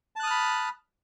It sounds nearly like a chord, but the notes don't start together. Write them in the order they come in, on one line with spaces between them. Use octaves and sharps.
A5 F#6 D#6 F6 B5